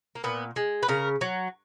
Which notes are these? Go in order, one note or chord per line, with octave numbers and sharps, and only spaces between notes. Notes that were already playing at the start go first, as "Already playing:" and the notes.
A#3
A#2 B3
G#3
B4
C#3 A#4
F#3